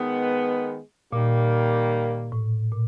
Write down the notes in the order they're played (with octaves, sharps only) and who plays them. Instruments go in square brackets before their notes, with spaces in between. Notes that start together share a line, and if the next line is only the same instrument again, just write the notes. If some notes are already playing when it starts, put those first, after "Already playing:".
Already playing: [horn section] D#3 G#3 B3
[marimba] A#2 [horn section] D#3 G3 A#3
[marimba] A2
A#2